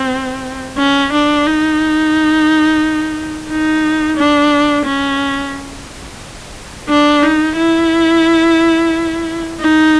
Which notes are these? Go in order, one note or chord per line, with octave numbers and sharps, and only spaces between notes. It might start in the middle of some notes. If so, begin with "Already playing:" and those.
Already playing: C4
C#4
D4
D#4
D#4
D4
C#4
D4
D#4
E4
D#4